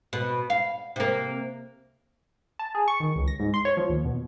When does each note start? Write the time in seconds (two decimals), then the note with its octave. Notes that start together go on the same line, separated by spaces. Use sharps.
0.13 B2
0.50 F5
0.96 C3 A#3
2.59 A5
2.75 G#4
2.88 C#6
3.00 D#3
3.16 C#2
3.28 A#6
3.40 G#2
3.54 C6
3.65 C#5
3.77 F3
3.89 D#2
4.05 B2